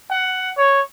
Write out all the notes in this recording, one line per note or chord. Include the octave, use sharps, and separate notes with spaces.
F#5
C#5